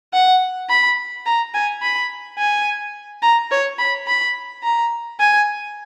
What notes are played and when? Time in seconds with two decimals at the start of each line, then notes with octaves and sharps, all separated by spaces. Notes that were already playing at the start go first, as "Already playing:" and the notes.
0.13 F#5
0.69 B5
1.26 A#5
1.54 G#5
1.82 B5
2.38 G#5
3.22 A#5
3.51 C#5
3.79 B5
4.07 B5
4.63 A#5
5.20 G#5